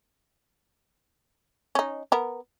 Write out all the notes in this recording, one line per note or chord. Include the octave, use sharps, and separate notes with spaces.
C#4 D#4
B3 A#4